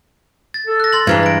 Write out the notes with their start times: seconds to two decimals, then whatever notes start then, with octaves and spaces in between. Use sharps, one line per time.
0.54 A6
0.67 A4
0.80 F#6 A#6
0.93 C6 A6 F#7
1.07 G2 E3 G#3 A#5 F6 G#6
1.23 A#6 D7